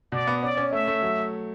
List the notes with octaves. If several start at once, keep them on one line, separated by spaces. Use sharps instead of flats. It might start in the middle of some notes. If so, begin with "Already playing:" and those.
B2 D5
B3
C#4 D5
C#4
A3 E5
A3
F#3